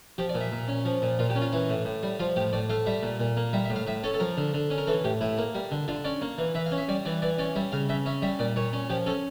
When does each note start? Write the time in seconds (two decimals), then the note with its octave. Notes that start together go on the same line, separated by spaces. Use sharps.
0.18 F3 G4
0.29 D5
0.35 A#2
0.40 E5
0.52 A#2
0.68 C#4
0.85 F3
1.02 A#2
1.19 A#2 F4
1.30 G4
1.35 C#4
1.41 F4
1.52 E3 E4
1.69 A2
1.85 A2
2.03 G3
2.20 F3 F4
2.36 A2 G4
2.53 A2 D5
2.70 A3 F5
2.86 G3 E5
3.03 A#2
3.20 A#2
3.37 A#3
3.53 G3 E5
3.65 E5
3.70 A2
3.76 F5
3.87 A2 E5
4.03 C#4 A4
4.14 A4
4.20 F3 A#4
4.37 D3
4.54 D3
4.70 C#4
4.78 A#4
4.87 E3 A4
5.04 A2 G4
5.21 A2 E4
5.38 A#3
5.55 G3
5.71 D3
5.88 D3 F4
6.04 C#4 D5
6.22 A#3
6.38 E3
6.54 E3 E5
6.66 F5
6.71 C#4
6.78 E5
6.88 G3 D5
7.05 E3 D5
7.22 E3 D5
7.39 C#4 D5
7.56 G3 E5
7.72 C#3 F5
7.89 C#3 E5
8.06 C#4 E5
8.22 G3 E5
8.39 A#2 D5
8.56 A#2 C#5
8.73 C#4
8.90 F3 G4
9.06 C#4 A4